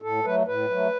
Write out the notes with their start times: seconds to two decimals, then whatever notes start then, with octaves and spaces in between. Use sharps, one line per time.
0.02 A2 A4
0.25 F#3 A3 B4
0.46 A2 B4
0.70 F#3 A3